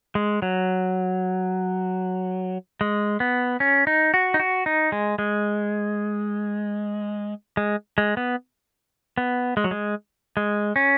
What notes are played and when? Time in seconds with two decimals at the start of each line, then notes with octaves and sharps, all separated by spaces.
0.15 G#3
0.42 F#3
2.81 G#3
3.20 B3
3.60 C#4
3.87 D#4
4.14 F#4
4.34 D#4
4.40 F#4
4.66 D#4
4.92 G#3
5.19 G#3
7.57 G#3
7.98 G#3
8.17 B3
9.18 B3
9.57 G#3
9.64 F#3
9.71 G#3
10.37 G#3
10.76 C#4